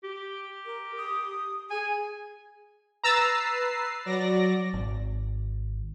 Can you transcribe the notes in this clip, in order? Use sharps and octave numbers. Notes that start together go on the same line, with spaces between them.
G4
A#4
D#6
G#4 G#5
B4 A#5 E6 A6 C7
F#3 D5 A#6
G#1